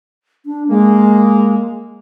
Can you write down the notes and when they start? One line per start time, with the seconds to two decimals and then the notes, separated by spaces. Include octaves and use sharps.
0.46 D4
0.69 G#3 A#3